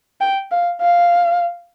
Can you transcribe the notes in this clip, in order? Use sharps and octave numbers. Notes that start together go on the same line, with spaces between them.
G5
F5
F5